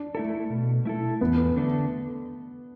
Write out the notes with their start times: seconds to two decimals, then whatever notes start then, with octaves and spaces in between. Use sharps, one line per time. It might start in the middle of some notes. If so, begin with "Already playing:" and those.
Already playing: D4
0.15 A3 E4 A4
0.50 B2
0.85 A3 E4 A4
1.21 E2 B3
1.56 D3 A3 D4 A4